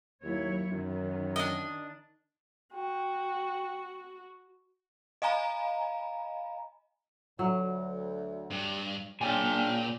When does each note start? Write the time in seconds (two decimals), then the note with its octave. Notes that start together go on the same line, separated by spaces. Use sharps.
0.23 D#2 F#3 E4 C#5
0.71 F#2 D#3
1.36 D4 D#5
2.74 F#4 G5
5.22 D#5 F5 G#5 A#5 B5
7.39 D2 F#3
8.51 G2
9.21 A#2 C#3 D4 D5 G5 G#5